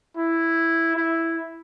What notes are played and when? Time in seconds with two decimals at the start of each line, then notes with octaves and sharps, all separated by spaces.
0.17 E4
0.96 E4